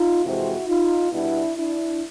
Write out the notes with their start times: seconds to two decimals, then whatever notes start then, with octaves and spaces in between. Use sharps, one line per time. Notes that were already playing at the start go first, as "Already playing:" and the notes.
Already playing: D#4 F4
0.24 F2 C3 E3 G#3 C4 E4 F#4
0.68 D#4 F4
1.12 B2 G3 B3 D4 E4
1.56 D4 E4